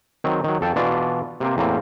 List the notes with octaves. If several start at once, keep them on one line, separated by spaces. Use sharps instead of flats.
D#3 F#3 C4
D#3 F#3
F2 A4 G5 A5
B2 E3 D4 F4 D5
C3 A#3 C4
E2 A2 A#3 C4